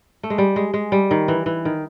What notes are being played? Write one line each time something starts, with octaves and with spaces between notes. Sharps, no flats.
A3
G#3
G3
G#3
G#3
G3
D#3
E3
E3
D#3